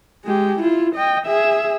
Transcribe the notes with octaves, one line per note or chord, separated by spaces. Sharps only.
G#3 G4
E4 F4
D#5 G5
G#4 E5